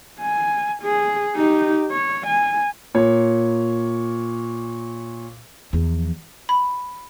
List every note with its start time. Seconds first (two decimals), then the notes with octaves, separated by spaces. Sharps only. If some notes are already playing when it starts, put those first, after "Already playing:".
0.21 G#5
0.83 G#4
1.36 D#4 G4
1.91 C#5
2.27 G#5
2.95 A#2 C#5
5.73 E2 F3
6.49 B5